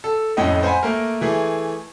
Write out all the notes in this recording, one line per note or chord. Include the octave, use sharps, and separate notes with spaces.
A4
F2 A2 C#4 D#5 G5
C5 F#5 G#5 B5
A3 A#3 A#4
E3 A3 G#4